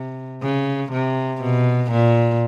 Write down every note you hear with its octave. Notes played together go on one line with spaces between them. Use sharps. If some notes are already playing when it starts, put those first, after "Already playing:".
Already playing: C3
C#3
C3
B2
A#2